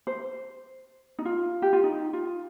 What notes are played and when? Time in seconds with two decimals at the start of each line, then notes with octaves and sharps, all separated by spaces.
0.07 C5
1.19 D#4
1.25 F4
1.62 G4
1.73 F4
1.84 D#4
2.13 F4